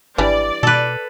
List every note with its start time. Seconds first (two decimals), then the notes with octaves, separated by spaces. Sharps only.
0.18 G#1 E3 G3 D4 D5
0.63 B2 A4 B4